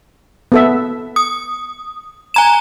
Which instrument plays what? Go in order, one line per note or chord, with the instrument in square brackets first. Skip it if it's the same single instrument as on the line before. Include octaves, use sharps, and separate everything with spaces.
[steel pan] B3 A4 E5
[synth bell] D#6
G#5 A#5 E7